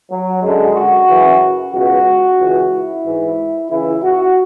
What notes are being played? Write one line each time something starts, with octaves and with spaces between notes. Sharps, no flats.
F#3
F#2 D3 G#3
F#4
F#2 C#3 E3
C#2 B2 F#4
C#2 C#3 E3
E4
G#2 E3
C#2 C#3 E3 E4
F#4